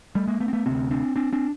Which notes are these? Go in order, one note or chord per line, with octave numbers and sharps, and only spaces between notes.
G3 A3
G#3 A#3
A3 B3
C4
A3 B3
D2 C3 A#3 C4
C4 D4
C4 D4
C4 D4